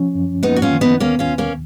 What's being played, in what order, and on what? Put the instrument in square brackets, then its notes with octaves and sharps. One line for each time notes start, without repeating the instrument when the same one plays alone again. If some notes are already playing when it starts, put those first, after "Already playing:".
Already playing: [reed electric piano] F3 C#4
F#2
[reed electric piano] A#3 [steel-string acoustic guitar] B3 D#4
[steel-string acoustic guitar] F#4
C#4 F4
[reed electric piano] D#3
[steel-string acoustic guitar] B3 D#4
[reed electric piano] D#2 [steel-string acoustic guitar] A#3 C#4
[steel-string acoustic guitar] C#4 F4
[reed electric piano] D#2
[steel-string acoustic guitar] A#3 C#4